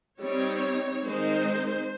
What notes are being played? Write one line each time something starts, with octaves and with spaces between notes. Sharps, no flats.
G3 C4 D#4 C#5
D#3 G#3 C4 D#4 C5